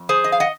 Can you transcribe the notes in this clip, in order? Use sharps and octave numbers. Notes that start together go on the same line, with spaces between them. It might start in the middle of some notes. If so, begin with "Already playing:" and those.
Already playing: F2
G#4 C5
D#5
F5
D#5 F#5